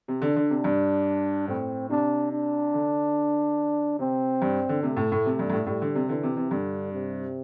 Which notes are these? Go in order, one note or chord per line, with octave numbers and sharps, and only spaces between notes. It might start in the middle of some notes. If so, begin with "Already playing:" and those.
C3
D3 D4
D3
C3
G2
A2 C4
C3 D4
D4
D3
C3 C4
G2
D3
C3 A3
A2
A2
C3
G2
G2
A2
A2 G3
D3
C3
D3 E3
C3
C3
G2 D3
C3